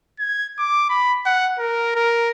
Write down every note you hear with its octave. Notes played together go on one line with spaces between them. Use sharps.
G#6
D6
B5
F#5
A#4
A#4